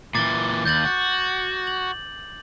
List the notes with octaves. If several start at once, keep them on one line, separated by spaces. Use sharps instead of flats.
A#2 E3 D6 A6
D#2 G6 A6 F#7
F#4
F#7